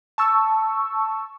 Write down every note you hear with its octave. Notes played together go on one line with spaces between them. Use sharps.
A5 C#6 E6